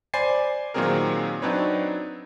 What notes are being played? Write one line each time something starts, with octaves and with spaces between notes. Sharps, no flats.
C5 D5 G#5 B5 A6 C7
A#2 D#3 F#3 C4 G#4 A#4
F#3 C4 D4 D#4 B4 C#5